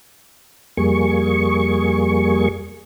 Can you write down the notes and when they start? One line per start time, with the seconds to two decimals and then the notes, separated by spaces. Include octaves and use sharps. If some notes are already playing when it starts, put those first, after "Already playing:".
0.77 F2 G3 A#3 G#4 C#6